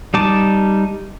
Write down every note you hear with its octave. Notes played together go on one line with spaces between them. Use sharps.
G3 D#4 A5 D6